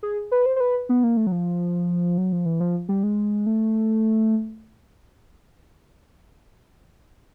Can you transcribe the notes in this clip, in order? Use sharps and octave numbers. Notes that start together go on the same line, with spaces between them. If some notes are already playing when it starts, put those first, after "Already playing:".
G#4
B4
C5
C5
B4
B3
A#3
A3
F#3
F3
F#3
F3
E3
F3
G3
G#3
A3